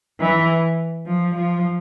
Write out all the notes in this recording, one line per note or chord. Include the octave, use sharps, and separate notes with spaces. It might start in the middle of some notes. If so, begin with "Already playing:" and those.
E3
F3
F3